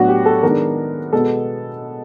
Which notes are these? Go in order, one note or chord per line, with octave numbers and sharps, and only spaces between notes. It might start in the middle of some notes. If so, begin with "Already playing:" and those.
Already playing: A2 F#3 B3 D4 F#4
G4
A4
D#3 G#3 B3 D4 A#4
B2 G#3 B3 A4